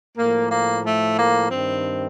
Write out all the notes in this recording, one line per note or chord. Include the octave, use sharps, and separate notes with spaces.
A2 F3 A#3
A#3
A3
A#3
G2 D#3 C4